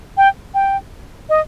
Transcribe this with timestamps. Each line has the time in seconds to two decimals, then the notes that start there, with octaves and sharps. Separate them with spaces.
0.17 G5
0.54 G5
1.29 D#5